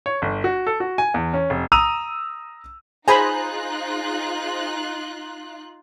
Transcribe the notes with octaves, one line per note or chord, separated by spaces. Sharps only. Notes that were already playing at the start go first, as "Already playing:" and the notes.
C#5
G1
F#4
A4
F#4
G#5
E2
C#4
F1
A#5 D#6 E6 D#7 F7
D#4 F4 G#4 C5 G#5 A#5 B5 F#6